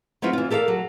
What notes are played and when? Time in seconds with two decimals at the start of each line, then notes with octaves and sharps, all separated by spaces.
0.22 F#3 B3 C4 E4 F4
0.33 E3 F4
0.50 G4 A4 A#4 C5 F5
0.68 F#3